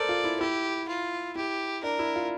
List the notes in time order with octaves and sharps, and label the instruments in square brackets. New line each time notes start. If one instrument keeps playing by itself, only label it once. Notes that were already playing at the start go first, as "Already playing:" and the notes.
Already playing: [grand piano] A4 A#4 C5 [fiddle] D5
[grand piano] F4
E4
[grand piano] E4 [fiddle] G4
[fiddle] F4
[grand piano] E4 [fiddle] G4
[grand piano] D4 [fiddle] A#4
[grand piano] E4
F4